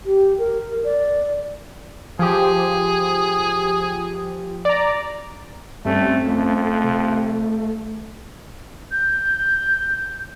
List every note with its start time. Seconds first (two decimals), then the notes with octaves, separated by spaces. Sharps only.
0.06 G4
0.39 A#4
0.84 D5
2.19 F3 G4 G#4
4.65 D5 A#5
5.85 G2 G3 A3 C4 C#4
6.27 F2 A3
6.84 C3
8.92 G6